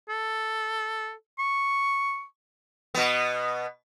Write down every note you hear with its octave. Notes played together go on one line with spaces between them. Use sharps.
A4
C#6
B2 B3